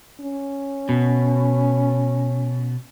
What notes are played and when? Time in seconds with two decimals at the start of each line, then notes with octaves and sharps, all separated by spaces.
0.20 C#4
0.89 B2